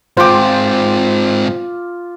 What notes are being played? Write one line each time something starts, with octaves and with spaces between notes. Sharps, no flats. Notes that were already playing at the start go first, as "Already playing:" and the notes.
G#2 C4 F4 C5 G5 D6